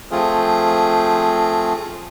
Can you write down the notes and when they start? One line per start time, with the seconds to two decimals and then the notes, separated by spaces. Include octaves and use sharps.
0.11 F3 A3 C4 F4 G#4